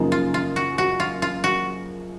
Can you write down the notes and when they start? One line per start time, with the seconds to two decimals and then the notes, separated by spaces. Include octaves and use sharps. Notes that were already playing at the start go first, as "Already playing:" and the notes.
Already playing: F#2 C#3 F3 A#3 D#4
0.12 F4
0.34 F4
0.56 F#4
0.78 F#4
1.00 F4
1.22 F4
1.44 F#4